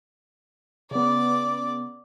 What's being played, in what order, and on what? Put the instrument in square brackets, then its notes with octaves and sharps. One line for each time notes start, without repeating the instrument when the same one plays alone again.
[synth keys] C#3 B3 [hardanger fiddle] D5